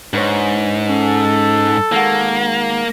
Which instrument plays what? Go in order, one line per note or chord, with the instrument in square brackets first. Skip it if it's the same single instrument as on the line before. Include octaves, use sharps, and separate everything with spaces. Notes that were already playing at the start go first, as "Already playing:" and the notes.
[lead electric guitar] G#2 [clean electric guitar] D4 B4 C#5
[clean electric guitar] C#4 [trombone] A4
[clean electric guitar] D#3 G#3 F#5 [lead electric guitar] A#3